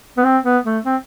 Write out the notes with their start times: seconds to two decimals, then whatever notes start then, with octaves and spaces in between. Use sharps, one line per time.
0.17 B3
0.24 C4
0.44 B3
0.65 A3
0.85 C4